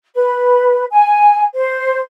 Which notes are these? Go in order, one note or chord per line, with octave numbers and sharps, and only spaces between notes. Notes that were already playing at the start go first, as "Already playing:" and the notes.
B4
G#5
C5